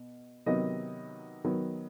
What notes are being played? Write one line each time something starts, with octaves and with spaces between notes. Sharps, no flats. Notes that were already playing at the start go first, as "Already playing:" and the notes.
Already playing: B2
C3 D#3 F#3 B3 D#5
D#3 F#3 B3